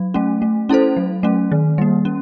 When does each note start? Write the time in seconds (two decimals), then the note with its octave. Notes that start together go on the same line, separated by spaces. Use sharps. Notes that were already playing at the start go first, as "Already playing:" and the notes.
Already playing: F#3
0.14 A3 C#4
0.42 A3
0.69 C#4 E4 A4 C5
0.97 F#3
1.23 A3 C#4
1.52 D#3
1.78 G3 A#3
2.05 C#4